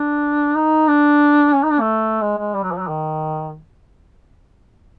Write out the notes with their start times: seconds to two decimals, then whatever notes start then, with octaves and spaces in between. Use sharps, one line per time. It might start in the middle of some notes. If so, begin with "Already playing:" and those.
Already playing: D4
0.55 D#4
0.88 D4
1.54 C#4
1.63 D#4
1.72 D4
1.80 A3
2.22 G#3
2.38 G#3
2.55 G3
2.63 F#3
2.71 F3
2.79 F#3
2.88 D#3